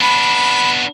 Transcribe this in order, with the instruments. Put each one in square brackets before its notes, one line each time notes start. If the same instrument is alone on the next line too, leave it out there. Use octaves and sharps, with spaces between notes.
[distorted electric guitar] B3 D4 [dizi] B5